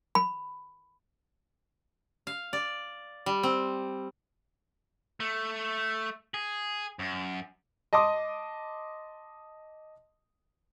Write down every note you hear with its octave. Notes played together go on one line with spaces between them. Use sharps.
B5
F5
D5
G3
C4
A3
G#4
F#2
D#5 A5 C6 D6 D#6